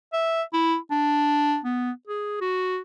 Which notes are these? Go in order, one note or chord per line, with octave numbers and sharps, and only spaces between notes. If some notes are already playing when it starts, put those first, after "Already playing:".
E5
E4
D4
B3
G#4
F#4